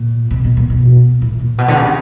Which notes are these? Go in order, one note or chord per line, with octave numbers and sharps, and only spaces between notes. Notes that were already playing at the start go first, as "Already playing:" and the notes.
Already playing: A#2
C3
B2
A#2
B2
A2
A#2
B2
D3
C#3
C3